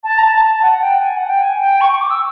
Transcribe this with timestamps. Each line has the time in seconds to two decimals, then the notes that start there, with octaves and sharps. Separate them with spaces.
0.04 A5
0.18 A#5
0.23 A5
0.43 A5
0.62 F#5
0.82 G5
1.02 G#5
1.17 F#5
1.29 G5
1.41 G#5
1.61 G5
1.81 C#6
1.91 C#6
2.01 D6
2.10 E6